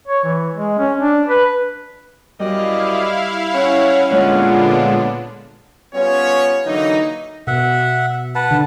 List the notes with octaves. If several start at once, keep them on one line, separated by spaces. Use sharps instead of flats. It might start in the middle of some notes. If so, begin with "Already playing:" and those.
C#5
E3
G#3
C#4
D4
B4
F#2 G3 E4 D5 D#5 F5
C#4 C#5 F#5
A#2 D3 G#3 B3 D4 F4 C#5 F#5
G3 B3 C#4 F4 C#5
D3 E3 F#3 A#3 D#4
B2 E5 F#5
B4 F#5 A5
D3